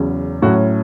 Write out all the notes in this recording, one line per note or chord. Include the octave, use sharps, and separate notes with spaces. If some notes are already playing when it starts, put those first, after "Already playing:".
Already playing: E2 C#3 F#3 C#4
A2 F#3 C#4 F#4